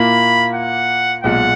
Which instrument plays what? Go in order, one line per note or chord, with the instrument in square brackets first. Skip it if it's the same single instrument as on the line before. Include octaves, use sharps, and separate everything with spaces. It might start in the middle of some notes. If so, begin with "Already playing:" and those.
Already playing: [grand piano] A#2 A#3 E4 [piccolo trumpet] B5
[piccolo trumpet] F#5
[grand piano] B1 A#2 G#3 [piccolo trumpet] F#5